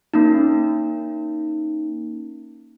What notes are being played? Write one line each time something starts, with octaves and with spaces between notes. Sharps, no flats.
A#3 C#4 D#4